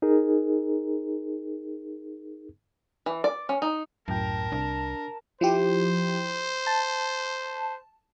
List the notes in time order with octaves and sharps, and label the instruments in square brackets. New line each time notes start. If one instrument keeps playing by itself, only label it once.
[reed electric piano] D#4 G#4 A#4
[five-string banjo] E3
D5
C#4
D#4
[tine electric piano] C#2 A2 G5 [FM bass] F#2 [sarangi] A#4 [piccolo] A5
[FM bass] C2 [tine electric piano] D4
[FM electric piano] F3 E4 G4 [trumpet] C5
[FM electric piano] A5